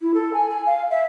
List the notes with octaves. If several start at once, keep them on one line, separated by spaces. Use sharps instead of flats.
E4
A4
G#5
G#5
F5
E5